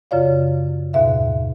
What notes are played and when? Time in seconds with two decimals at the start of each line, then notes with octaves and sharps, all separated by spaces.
0.11 F#2 C#3 F4 C#5 D5 F5
0.93 D#2 G#2 B2 E5 F5